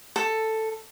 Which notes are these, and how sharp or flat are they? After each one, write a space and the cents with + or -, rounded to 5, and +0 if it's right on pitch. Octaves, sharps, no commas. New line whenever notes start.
A4 +5